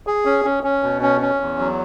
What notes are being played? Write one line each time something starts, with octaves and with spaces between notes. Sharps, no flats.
G#4
C#4
C#4
C#4
B2
C#4
C#4
E2
F#3